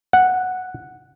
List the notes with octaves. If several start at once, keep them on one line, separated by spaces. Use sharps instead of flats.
F#5